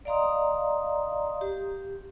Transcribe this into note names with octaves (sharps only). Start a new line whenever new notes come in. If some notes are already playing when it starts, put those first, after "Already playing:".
D5 D#5 F5 A#5 C6 D#6
G4